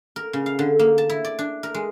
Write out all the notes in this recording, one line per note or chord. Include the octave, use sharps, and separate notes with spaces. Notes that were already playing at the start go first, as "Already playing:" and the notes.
A#4
C#3
F5
D3
A#3
A5
E4
D5
D4
A#4
G#3